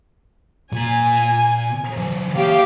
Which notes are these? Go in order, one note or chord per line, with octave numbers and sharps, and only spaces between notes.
A#2 G#5 A#5
E3 F#3
A#2 G4 C#5 F5